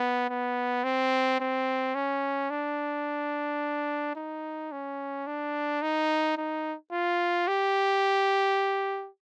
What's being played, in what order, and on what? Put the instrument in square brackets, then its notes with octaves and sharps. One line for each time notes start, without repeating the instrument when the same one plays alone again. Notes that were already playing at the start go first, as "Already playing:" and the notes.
Already playing: [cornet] B3
B3
C4
C4
C#4
D4
D#4
C#4
D4
D#4
D#4
F4
G4